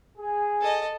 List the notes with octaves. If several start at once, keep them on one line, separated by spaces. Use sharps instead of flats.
G#4
A4 D#5